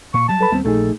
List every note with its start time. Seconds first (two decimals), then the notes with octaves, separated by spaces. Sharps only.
0.14 A#2 C#6
0.29 F#3 G3 A5
0.41 A4 B4 B5
0.52 D#2 G3 B3 C4
0.65 A#1 A3 D#4 G#4 A4